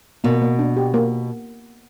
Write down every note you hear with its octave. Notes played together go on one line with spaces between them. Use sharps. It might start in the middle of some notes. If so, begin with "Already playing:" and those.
B2 A#3
A#3
D4
G4
A#3